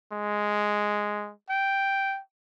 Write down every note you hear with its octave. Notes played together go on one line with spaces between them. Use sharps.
G#3
G5